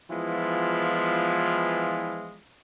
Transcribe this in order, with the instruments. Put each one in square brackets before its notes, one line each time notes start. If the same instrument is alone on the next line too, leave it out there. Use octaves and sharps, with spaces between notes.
[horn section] E3 F3 G#3 B3 E4 F4